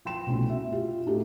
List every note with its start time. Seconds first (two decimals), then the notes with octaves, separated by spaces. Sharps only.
0.05 F3 G5 C6 E7
0.26 C2 B2 A3 C#4 F#4
0.49 F#4 E5
0.72 E4 F4 G4
1.06 A2 D#4 F#4 G4 A4